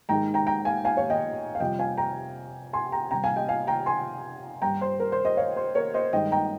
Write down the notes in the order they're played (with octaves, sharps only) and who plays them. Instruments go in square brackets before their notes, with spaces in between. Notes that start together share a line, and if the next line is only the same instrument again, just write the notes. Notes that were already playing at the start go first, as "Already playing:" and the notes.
[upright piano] G#2 D#3 G#3 G5 A#5
G5 A#5
G5 A#5
F5 G#5
F5 G#5
C#5 F5
D#5 G5
F5
F2 C3 G3 D#5 G5
F5 G#5
G5 A#5
G#5 C6
G5 A#5
C3 G3 G5 A#5
F5 G#5
D#5 G5
F5 G#5
G5 A#5
G#5 C6
G2 G3 G5 A#5
C5
A#4
C5
C5 D#5
C#5 F5
C5
A#4 C#5
C5 D#5
G2 D#3 G#3 D#5 G5
G5 A#5